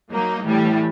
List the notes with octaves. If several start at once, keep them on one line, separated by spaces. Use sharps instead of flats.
F#3 A#3 D#4
A2 E3 G3